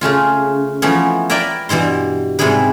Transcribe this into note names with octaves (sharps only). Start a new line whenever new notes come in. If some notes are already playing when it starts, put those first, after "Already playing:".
C#3 A3 C#4 F4
E3 F3 A3 B3 C#4
E4 A#4 B4 D5 E5 G5
G2 B2 E3 E4 C6
G#2 C3 G3 E4 G#4 B4